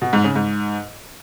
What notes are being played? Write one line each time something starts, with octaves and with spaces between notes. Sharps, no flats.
B2
G#2
C#3
G#2